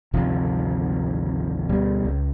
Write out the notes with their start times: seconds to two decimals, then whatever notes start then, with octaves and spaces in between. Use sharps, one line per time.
0.13 G#1 D2 C3 F3
1.69 D2 B2 G3
2.05 C#2